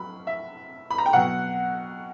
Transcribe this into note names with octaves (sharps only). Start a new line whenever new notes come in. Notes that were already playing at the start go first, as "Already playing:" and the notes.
Already playing: F#3 B5
E5
B5
A#5
G5
B2 F#3 F#5